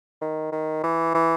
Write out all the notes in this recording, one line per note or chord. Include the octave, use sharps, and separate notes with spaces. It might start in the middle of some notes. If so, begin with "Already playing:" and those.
D#3
D#3
E3
E3